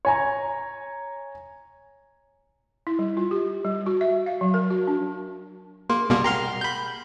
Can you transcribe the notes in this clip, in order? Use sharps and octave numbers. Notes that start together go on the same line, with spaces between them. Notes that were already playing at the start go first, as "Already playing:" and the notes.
C#5 G#5 A#5
E4
G3
F4
G4
G3
F#4
E5
F5
F#3
A#4
F#4
D4
A#3 G#4 C6
B2 G3 A#3
F#5 G5 A#5 C6 F6
B5 G6